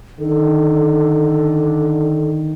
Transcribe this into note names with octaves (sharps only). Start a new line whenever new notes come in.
D3 D#3 A4